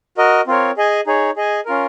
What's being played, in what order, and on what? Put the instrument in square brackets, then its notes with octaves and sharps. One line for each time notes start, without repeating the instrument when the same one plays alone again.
[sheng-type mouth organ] F#4 A#4 D#5
C4 F4 A#4 C#5
G#4 D#5 G#5
D#4 G#4 C#5
G#4 D#5 G#5
C#4 F4 A#4